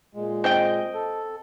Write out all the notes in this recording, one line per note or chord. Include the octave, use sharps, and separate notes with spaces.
A#2 G#3
C4 D#5 G5
A4